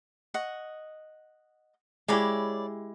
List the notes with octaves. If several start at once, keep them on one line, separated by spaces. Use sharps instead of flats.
D#5 F#5 C#6
G#3 E4 G4 C#5 D5 B5